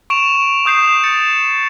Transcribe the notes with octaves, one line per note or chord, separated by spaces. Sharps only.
C#6 D7 E7 F7
C#6 D#6 G6 C7 E7 F7
A6 C#7